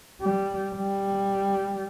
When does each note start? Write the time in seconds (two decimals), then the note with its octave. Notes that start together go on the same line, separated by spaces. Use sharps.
0.21 G3
0.76 G3